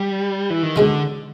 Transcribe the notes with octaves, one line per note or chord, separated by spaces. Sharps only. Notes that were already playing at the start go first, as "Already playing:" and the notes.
Already playing: G3
E3
D#3
B2 D3 G#3 C#4 E4